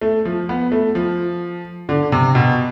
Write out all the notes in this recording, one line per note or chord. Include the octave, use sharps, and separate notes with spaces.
A3
F3
B3
A3
F3
D3
C3
B2